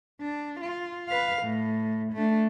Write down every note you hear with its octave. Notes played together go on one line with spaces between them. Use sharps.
D4
F4
B4 F5
A2
A3 D4